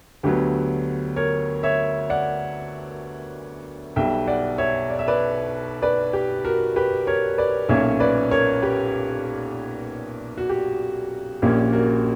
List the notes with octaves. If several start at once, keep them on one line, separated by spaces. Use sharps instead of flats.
D2 D3 F#3 B3 G4
A#4 C#5
C#5 E5
D5 F#5
B1 B2 G3 E5 G5
D5 F#5
C#5 E5
D5
E5
B4 D5
B4 D5
G4
F#4 A#4
G4 B4
A#4 C#5
B4 D5
B1 A#2 A#3 C#4 C#5 E5
B4 D5
A#4 C#5
G4 B4
F#4
G4
A#1 A#2 A#3 C#4 G4
F#4 A#4